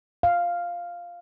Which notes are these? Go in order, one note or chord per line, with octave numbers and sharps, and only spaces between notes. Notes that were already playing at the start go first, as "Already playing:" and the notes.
F5